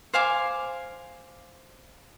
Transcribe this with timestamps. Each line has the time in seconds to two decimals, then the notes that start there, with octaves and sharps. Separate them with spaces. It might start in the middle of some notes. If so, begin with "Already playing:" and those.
0.14 C5 F5 G#5 D6